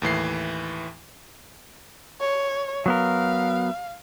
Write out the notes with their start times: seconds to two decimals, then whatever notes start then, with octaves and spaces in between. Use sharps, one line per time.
0.02 D#2 A2 E3 C7
2.21 C#5
2.86 F#3 B3 A#4 F5